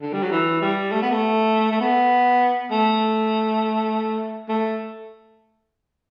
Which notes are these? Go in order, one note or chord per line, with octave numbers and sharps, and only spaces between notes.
D3
G3
F#3
E3
G3
A3
B3
A3
A3
B3
A3
A3